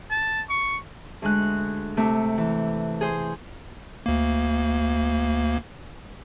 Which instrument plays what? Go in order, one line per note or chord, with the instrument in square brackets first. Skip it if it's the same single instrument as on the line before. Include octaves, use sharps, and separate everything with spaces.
[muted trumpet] A5
C#6
[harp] D2 G#3 F#6
C3 A3
E3
G#4 C5
[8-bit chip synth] D2 A#3